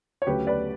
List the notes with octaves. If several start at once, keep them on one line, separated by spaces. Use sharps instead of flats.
C#5
D2 C#3 F#3 A3 G4 B4
B4 D5